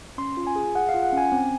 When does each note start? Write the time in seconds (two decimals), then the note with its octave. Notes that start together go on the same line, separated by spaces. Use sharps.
0.18 C#4 C6
0.37 F4
0.47 G#5
0.56 G#4
0.75 G#4 F#5
0.89 F5
0.94 F4
1.03 F#5
1.13 C#4 G#5
1.32 C4